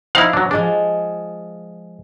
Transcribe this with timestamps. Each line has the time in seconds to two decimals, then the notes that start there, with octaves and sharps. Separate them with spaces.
0.15 F3 D#4 E4 F5
0.33 F#3 D4
0.51 F3 G#3 D4 G#4